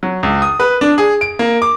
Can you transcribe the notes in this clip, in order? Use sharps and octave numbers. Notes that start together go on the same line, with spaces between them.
F#3
C#2
D#6
B4
D4
G#4
D7
A#3
D6